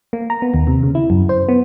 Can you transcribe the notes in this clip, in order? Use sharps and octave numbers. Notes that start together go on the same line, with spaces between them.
A#3
A#5
B3
D#2
C3
C#3
E4
F#2
C5
B3